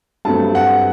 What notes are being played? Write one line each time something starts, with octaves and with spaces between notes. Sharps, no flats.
G2 F#3 A3 C4 A5
F#5